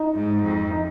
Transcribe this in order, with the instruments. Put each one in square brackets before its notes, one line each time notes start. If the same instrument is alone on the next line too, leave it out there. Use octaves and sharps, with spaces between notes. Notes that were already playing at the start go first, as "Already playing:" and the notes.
Already playing: [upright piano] D#4
[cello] G#2
F2
[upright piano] D#4